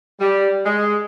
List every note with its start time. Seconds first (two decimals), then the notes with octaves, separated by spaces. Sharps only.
0.20 G3
0.65 G#3